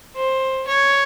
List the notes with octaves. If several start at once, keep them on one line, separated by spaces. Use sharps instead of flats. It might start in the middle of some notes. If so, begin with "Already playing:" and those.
C5
C#5